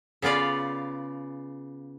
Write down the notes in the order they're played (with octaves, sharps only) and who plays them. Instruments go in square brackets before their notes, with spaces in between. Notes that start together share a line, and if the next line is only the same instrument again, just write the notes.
[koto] C#3 B3 F4 D5 F5